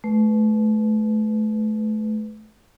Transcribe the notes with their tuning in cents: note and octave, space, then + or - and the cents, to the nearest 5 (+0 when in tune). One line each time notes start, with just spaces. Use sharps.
A3 -30 B4 +10